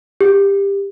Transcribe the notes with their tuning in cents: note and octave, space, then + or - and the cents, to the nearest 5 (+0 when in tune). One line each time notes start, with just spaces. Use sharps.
G4 +20